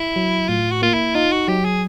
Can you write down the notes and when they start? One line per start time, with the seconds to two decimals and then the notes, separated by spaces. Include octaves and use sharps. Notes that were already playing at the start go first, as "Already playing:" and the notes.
Already playing: E4
0.16 F#3
0.49 A2 F4
0.71 F#4
0.82 A#3 F4
0.94 E4
1.15 D#4 F4
1.32 F#4
1.48 F#3 G4
1.65 G#4